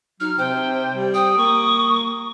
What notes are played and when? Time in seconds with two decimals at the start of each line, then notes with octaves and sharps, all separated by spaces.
0.20 F#3 D#4 F6
0.38 C3 C5 G5
0.93 G3
1.14 G5 D#6
1.38 A#3 C#6